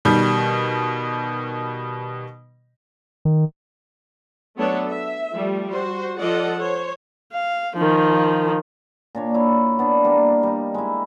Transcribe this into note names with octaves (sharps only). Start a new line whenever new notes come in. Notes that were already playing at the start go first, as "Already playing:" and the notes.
B2 D#3 G3
D#3
F#3 A3 B3 D4 A4 C#5
E5
F3 G3 A3
F#4 C5
F3 F4 A4 D5 D#5 F#5
C5 C#5
F5
D#3 F3
A#2 D4 C#5
E4 C#5
B3 D4
G3 A#3
G3 D#4
G#3 E4